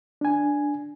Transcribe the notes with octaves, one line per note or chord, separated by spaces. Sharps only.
D4 G#5